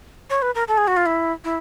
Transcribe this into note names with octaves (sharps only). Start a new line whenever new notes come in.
C#5
B4
A#4
A4
G#4
F#4
F4
E4
E4